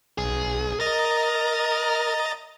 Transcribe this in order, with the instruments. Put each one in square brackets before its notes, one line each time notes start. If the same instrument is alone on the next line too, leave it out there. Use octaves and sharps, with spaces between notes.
[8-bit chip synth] B1 [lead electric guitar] G#4
[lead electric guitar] A#4 [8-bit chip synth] D#5 A#5 A6